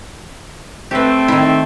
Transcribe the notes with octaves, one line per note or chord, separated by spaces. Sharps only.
A3 C4 G4 B4
D#3 E4